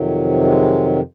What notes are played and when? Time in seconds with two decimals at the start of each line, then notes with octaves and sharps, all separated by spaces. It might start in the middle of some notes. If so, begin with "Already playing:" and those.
Already playing: F2 C3 D#3 F#3
0.45 G#3